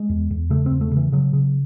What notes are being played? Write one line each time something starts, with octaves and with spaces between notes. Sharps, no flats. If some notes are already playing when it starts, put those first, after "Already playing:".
Already playing: G#3
E2
E2
C#3 A3
C4
E2
A3
C#3
E3
C#3 F#3
C#3